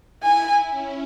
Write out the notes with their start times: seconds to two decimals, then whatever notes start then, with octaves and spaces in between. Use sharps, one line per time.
0.22 E4 G#5
0.71 C#4